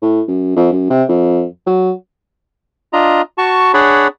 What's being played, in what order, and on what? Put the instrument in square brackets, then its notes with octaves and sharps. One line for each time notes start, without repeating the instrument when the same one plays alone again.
[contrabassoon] A2
F#2
F2
F#2
C3
F2
F#3
[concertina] D4 F4 D#5 A#5
F#4 A5 C#6
D4 G#4 C#5 D5 F#5 B5